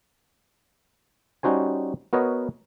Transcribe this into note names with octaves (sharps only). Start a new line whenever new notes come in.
G3 C#4 D#4 F#4 C5 G#5
B3 F#4 A#4 B4 C#5 D#5